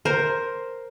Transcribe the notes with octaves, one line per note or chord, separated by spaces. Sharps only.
A#4 C5